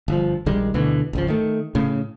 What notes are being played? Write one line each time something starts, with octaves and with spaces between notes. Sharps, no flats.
G1 F3
A#1 D#3 G3 G#3
D2 B2 D3 E3
G#1 C#2 F3
D#3 A3
A2 C#3